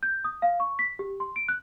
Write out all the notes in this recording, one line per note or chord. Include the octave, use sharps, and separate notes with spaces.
G6
D#6
F5
C#6
B6
G4
C6
D7
F#6